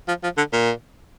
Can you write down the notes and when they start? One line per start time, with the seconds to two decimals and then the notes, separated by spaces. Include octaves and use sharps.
0.08 F3
0.23 F3
0.37 D3
0.53 A#2